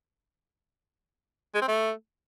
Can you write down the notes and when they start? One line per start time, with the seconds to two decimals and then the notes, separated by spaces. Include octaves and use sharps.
1.55 G#3
1.61 C4
1.68 A3